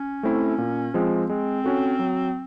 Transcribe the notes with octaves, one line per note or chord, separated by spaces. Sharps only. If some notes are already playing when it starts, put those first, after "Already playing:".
Already playing: C#4
A3 C4 E4
A#2
F3 G#3 C4
G#3 C4
C#4 F#4 A4
F#3